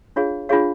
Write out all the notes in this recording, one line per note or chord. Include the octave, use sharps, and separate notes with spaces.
D4 F4 G#4 C#5 F5
D4 F4 G#4 C#5 F5